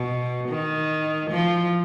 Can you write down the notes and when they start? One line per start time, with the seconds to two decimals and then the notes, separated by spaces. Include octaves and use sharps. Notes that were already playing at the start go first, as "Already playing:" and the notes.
Already playing: B2
0.49 D#3
1.31 F3